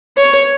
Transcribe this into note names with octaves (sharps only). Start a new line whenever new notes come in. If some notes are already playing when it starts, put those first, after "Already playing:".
C#5